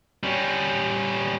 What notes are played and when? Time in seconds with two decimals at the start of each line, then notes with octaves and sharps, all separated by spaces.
0.23 G3 C#4